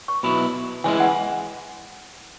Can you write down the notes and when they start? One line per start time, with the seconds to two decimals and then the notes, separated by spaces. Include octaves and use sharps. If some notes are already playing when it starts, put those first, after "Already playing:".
0.08 C#6
0.23 B2 F#3 E4 B5
0.84 E3 G#3 C#4 E4 G#5
1.00 F#5